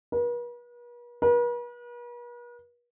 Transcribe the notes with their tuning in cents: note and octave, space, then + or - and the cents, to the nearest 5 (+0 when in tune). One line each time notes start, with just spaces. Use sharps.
B4 -45
B4 -45